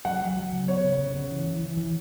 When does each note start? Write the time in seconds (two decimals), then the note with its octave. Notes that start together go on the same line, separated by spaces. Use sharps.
0.05 F#3 F#5
0.21 F#3
0.37 F#3
0.53 C#3
0.67 B3 C#5
0.84 C#3
0.99 C#3
1.15 C#3
1.31 E3
1.46 E3
1.62 E3
1.77 E3